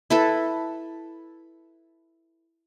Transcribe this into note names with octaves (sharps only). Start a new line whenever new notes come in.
E4 A4 B4